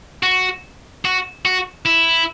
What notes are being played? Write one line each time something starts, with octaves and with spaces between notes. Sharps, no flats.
F#4
F#4
F#4
E4